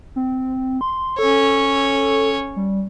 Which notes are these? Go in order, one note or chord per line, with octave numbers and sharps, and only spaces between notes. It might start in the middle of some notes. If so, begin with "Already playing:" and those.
C4
C6
C#4 A4 C#5
G3